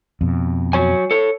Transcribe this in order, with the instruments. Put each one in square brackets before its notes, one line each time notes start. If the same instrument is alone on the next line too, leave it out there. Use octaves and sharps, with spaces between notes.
[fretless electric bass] F2 B2
[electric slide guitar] F#3 C#5 G#5
A4 C#5